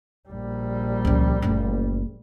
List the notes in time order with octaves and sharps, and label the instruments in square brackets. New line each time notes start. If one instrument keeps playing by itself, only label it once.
[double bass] A#1 G3
[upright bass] C#2 F3
F#1 A3